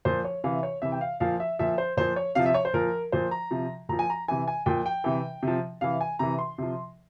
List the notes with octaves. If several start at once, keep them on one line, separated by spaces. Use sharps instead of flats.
A#2 F3 C5
C#5
C3 E3 F5
C#5
C3 E3 E5
G5
F5
A#2 F3 F5
E5
A#2 F3 E5
C5
A#2 F3 C5
C#5
C3 F3 F5
E5
C#5
C5
A#2 F3 A#4
A#2 F3 C5
A#5
C3 F3
A#2 F3 A#5
G#5
A#5
C3 E3 G#5
G#5
A#2 F3 G5
G5
C3 E3
C3 F3
C3 E3 F5
G#5
C3 E3 A#5
C6
C3 F3